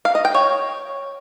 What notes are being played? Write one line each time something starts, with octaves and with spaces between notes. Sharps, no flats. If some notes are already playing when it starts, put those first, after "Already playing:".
F5
D#5
G5
C#5